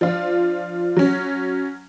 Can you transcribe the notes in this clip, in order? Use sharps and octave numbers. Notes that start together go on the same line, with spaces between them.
F3 D4 F4
F#3 C#4